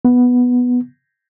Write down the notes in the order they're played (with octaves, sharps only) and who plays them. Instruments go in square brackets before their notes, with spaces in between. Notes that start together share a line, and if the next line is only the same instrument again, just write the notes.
[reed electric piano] B3